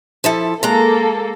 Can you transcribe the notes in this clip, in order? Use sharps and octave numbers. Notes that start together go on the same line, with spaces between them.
F3 E4 A4
G#3 A#3 A4 A#5